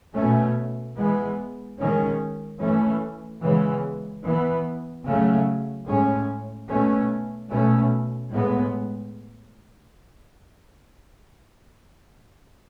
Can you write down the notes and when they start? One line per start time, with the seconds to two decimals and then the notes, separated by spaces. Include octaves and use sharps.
0.14 B2 A3 C#4
0.96 E3 G#3 B3
1.78 D#3 G#3 C#4
2.60 E3 A3 C#4
3.42 C#3 E3 G#3 B3
4.23 E3 B3
5.04 C#3 F#3 A3 C#4
5.86 A2 G#3 C#4
6.68 B2 A3 C#4
7.50 B2 A3 C#4
8.32 A2 G#3 B3